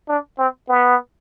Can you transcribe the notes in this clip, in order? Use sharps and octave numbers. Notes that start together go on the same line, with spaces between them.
D4
C4
B3